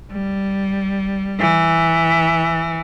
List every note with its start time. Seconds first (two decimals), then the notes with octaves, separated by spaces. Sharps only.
0.12 G3
1.40 E3